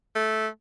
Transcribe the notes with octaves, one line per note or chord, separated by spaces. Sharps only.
A3